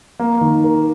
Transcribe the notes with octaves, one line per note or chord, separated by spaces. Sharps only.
A#3
D#3
A#4